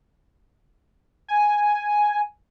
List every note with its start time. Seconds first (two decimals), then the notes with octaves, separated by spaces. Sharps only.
1.28 G#5